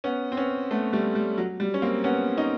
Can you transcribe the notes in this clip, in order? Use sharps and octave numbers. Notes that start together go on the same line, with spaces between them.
B3 C#4
C4
B3 C#4
A3 B3
G3 A3
G3
F#3
G3
C#4
A#3 C4
B3 C#4
C#4 D#4